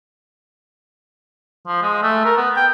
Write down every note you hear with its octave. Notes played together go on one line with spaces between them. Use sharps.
F3
G#3
A3
A#4
B3
G5